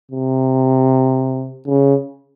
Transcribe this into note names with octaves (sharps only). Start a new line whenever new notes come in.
C3
C#3